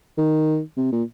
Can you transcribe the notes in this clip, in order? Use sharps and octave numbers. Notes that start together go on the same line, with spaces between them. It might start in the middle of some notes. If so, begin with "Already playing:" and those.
D#3
C3
A#2